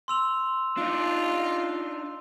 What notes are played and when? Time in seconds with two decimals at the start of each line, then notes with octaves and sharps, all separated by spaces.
0.08 C6 E6 F7
0.77 D4 D#4 F4